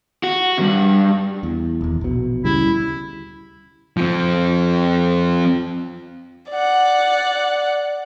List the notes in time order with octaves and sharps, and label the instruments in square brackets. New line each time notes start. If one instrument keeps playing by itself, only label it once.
[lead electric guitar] F#4
D2 G2
[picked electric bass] E2
D#1 E2
A#1 B2
[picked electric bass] D2 C#3 G3 [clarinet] E4
[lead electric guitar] F3 C4
[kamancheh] D5 F#5